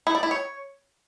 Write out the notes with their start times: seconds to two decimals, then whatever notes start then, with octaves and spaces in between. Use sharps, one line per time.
0.07 E4
0.15 D5
0.23 E4
0.31 C#5